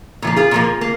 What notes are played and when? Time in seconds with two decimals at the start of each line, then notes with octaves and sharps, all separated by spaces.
0.22 A#2 F3 A#3
0.36 F4 G#4
0.51 A#2 F3 A#3
0.81 A#3